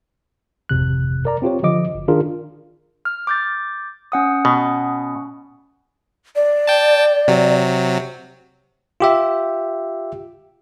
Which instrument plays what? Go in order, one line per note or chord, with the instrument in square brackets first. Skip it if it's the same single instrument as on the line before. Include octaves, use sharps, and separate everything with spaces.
[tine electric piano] G#1 F2 C3 F#6
A#4 D5 A#5
C4 F4 G4 C#5
D3 F3 D#5 D6
G1
D#3 D4 F4 G#4 A#4
[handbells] F6
D6 G6 A6
C#4 F#5 D#6
[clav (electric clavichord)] B2
[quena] D5
[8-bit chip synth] G5 A5
C3 F#3
[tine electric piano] F4 G4 E5